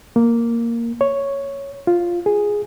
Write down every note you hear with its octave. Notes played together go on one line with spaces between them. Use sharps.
A#3
C#5
F4
G#4